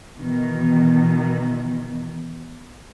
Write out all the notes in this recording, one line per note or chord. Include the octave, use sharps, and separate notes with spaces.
B2 D#3 E3